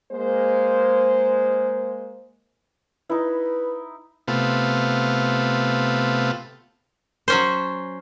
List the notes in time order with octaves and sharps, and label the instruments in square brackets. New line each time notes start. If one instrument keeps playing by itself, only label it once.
[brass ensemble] G#3 A#3 C5
[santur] D#4 E4 [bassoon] B4
[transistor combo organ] C3 A3 B3 F4
[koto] F#3 C#4 C5